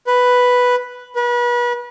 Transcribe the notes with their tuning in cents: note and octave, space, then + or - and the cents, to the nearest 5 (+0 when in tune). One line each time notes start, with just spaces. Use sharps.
B4 +0
B4 -35